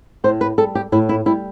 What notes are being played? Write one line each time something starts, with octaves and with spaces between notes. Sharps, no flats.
A2 C5
B4
G3 A4
G4
A2 E4
E4
G3 E4